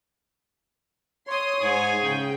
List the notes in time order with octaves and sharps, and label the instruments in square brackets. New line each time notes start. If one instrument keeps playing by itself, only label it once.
[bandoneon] C#5 [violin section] C6 D#6
[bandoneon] G#2 [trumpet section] G#4 C#5 G#5
[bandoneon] C#3 [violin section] G5